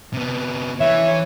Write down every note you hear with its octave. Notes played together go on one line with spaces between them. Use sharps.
C3 B3
E3 C#5 E5